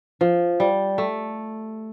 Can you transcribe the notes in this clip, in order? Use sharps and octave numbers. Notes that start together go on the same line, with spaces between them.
F3
G3
A3